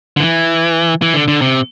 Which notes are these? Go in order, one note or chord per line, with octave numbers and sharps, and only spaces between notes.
D3
E3
E3
D3
D3
C3